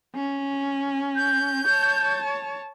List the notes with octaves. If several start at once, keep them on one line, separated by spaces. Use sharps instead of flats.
C#4
G6
C#5 A5